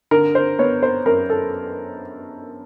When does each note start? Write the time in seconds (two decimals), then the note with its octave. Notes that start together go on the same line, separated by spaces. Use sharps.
0.11 D3 A#4
0.35 C5
0.59 B3 C#5
0.82 C5
1.06 F#2 A#4
1.30 A4